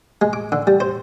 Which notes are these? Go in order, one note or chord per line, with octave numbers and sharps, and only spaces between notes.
G#3
D6
D3
G3
C5